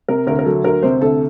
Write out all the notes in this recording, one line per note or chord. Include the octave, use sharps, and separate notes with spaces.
C3 A#4
D2 A#4
A#4
F#3 A4
D2 A#4
C3 C5
D2 A4